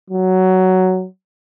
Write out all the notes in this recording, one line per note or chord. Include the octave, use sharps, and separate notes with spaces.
F#3